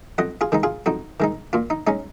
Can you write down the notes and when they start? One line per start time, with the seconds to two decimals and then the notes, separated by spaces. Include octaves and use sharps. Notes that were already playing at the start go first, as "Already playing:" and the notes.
0.18 F2 D#5 F#5
0.41 F4 G#4
0.52 D#3 G#3 D#4
0.63 F4 G#4
0.86 F2 D#4 F#4
1.20 D#3 G#3 D#4
1.53 A#2 F4
1.70 D#4
1.87 G#3 C#4 D#4